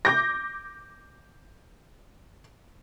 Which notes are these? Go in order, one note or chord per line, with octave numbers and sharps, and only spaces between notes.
D6 G6 A#6